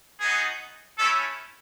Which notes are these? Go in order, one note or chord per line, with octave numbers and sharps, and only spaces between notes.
B3 D#4 F#4 G#4
A3 C#4 E4 A4